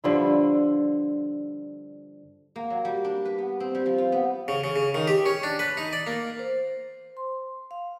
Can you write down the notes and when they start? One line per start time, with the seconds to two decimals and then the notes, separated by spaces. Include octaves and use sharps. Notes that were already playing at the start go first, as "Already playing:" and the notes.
0.04 G2 D3 F3 E4
2.56 A#3
2.70 F#3
2.85 G3
3.04 D4
3.25 B4
3.38 B3
3.60 C4
3.75 G3
3.86 F3
3.98 F4
4.12 B3
4.48 C#3
4.64 C#3
4.76 C#3
4.95 D#3
5.08 G4
5.26 C#4
5.43 D4
5.59 B4
5.77 D#4
5.93 D5
6.07 A#3
6.39 C5
7.17 C6
7.71 F5